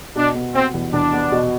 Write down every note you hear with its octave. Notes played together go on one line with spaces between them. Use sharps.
B2 D4
B3
B3 C4
E2
E2 D4
B3
B2